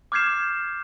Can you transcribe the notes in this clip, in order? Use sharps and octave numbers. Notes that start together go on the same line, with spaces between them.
D6 F6 G6 G#6 C7 E7